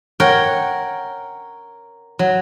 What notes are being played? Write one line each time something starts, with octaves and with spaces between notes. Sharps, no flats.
A#4 C#5 F#5 G5
F#3